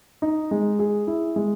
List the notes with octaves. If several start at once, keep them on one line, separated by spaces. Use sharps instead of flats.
D#4
G#3
G#4
E4
G#3